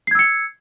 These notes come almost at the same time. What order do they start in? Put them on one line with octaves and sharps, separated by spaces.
C7 G#6 E6 C#7